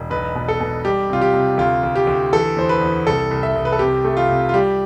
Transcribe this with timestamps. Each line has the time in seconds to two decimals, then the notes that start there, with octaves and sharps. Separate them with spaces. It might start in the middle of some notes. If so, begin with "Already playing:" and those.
Already playing: E1
0.10 B1 B4
0.35 B2
0.48 A4
0.60 B2
0.85 G3 G4
1.10 C3 F4
1.21 G4
1.33 C3
1.58 D2 F4
1.83 D2
1.96 G4
2.07 D2
2.33 E3 A4
2.56 E2 C5
2.69 B4
2.81 E2
3.06 C2 A4
3.31 C2
3.43 E5
3.56 C2
3.65 B4
3.72 A4
3.79 C3 G4
4.05 A3
4.17 F4
4.29 C3
4.49 F4
4.53 G3 G4